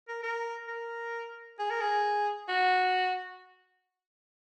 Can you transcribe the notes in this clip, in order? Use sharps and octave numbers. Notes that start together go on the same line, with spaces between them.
A#4
A#4
A#4
G#4
A#4
G#4
F#4